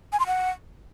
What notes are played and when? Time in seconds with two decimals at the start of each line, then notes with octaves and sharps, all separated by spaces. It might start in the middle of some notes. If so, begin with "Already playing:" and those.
0.12 G#5
0.20 C6
0.27 F#5